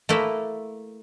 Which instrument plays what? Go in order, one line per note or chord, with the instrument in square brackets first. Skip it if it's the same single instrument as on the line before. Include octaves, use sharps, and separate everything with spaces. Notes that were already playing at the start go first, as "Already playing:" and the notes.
[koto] A3 A#3 E4